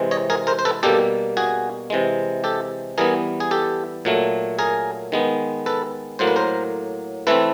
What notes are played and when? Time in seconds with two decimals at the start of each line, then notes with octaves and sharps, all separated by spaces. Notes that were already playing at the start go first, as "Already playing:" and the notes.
Already playing: C3 E3 G#3 C4
0.11 C#5 D#5
0.30 G#4 A#4
0.47 A#4 C5
0.59 C5
0.65 A4 B4
0.83 B2 G3 A#3 G4 A4
1.37 F#4 G#4
1.90 C3 E3 G#3
2.44 G4 A4
2.98 E3 G3 B3 G#4 A#4
3.40 G#4
3.51 G4 A4
4.05 A#2 F#3 A3
4.59 G#4 A#4
5.12 D#3 G#3 B3
5.66 A4 B4
6.19 A2 F#3 A#3 C5
6.27 B4
6.36 A#4 C5
7.27 E3 A3 C4 A4 B4